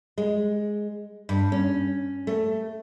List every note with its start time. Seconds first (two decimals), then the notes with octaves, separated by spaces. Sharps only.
0.18 G#3
1.29 G2
1.52 C#4
2.27 A3